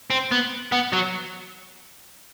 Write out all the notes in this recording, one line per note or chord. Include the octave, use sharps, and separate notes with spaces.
C4
B3
B3
F#3